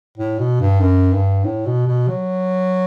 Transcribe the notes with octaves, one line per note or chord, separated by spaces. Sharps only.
A2
B2
G2
F#2
G2
A2
B2
B2
F#3